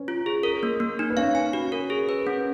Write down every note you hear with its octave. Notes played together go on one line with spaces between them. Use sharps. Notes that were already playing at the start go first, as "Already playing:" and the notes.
Already playing: C#4 B4 C#5
F4
G#4
A#4
A#3
A#3
D#4
B4
C#4 C#5 F5
G#5
F#4
A#4
G#4
B4
C#4